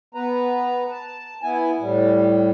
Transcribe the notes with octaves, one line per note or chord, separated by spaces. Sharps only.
B3 B4 A#5
A5
B3 E4 G#5
A2 G3